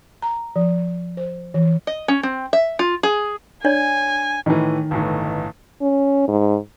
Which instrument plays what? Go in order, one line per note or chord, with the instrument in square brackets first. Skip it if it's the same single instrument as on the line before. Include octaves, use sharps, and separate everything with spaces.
[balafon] A#5
F3
C5
E3
[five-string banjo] D#5
C#4
C4
E5
F4
G#4
[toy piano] D4 C#5 D5 [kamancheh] G#5
[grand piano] A2 E3 [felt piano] D#3
[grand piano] G1 A2 E3
[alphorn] C#4
G#2